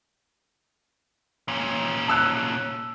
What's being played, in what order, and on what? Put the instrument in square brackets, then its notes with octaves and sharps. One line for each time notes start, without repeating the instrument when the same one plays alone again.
[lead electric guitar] A#2 C#4
[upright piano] A5 E6 F#6